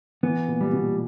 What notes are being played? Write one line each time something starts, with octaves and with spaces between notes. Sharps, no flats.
E3 B3
A#2
G3
B2